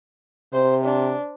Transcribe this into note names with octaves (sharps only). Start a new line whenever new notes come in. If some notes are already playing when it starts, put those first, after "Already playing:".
C3 C5
D4